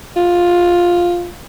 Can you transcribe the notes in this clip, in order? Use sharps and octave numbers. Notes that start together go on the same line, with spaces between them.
F4